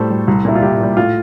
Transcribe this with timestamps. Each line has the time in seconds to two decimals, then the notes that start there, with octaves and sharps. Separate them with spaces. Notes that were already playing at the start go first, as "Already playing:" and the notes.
Already playing: A2 G3 A4 C5
0.10 G3
0.27 C2
0.45 A#2 G3 E4
0.55 F4
0.62 C2 G4
0.80 A#2 G3
0.97 A2 F4